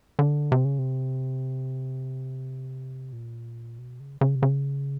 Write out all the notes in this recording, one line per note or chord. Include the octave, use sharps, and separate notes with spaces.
D3
C3
C#3
C3
A#2
B2
C#3
C#3
C3
C#3